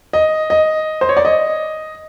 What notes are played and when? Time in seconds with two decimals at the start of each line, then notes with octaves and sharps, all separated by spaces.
0.13 D#5
0.50 D#5
1.01 C5
1.09 C#5
1.17 D5
1.25 D#5